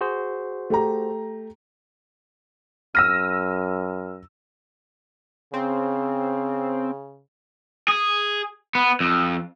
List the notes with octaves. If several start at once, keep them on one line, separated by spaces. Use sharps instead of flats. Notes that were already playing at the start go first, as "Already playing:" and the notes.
F#4 G#4 C5
A3 G4 A#5
F#2 E6 F6 A#6 D#7
C#3 C4
G#4
B3
F2